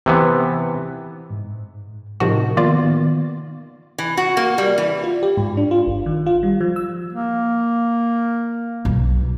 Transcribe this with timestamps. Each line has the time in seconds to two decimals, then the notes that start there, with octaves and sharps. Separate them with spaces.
0.06 C3 E3 B3
1.30 G#2
2.20 A2 C3 F3 D#4 F#4 A#4
2.57 D#3 A#3 B3 F4 D5
3.98 E3
4.17 F#4
4.37 A#3
4.58 G3
4.78 E3
5.04 F4
5.23 G4
5.37 G#2
5.57 D4
5.71 F4
5.87 G1
6.06 D#3
6.26 F4
6.43 G3
6.61 F3
6.76 E6
7.13 A#3
8.85 B1